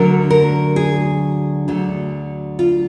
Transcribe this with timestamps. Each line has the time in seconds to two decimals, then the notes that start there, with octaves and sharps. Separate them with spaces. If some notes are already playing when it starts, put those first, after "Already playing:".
Already playing: D2 D3 F#3 A#4
0.30 A#4
0.76 G#4
1.68 D2 D3 F#3
2.59 F4